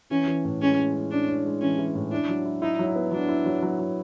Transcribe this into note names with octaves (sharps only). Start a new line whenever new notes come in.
E3 C#4
E3
A2
G#3 C#4
G#3
C#4
C#4 D4
C#4
G#3
E3 C#4
E3
A2
D4 E4
F#3
E4
D#4 E4
F#3
B3
F#3 D4
E4
F#3
F#3
F#3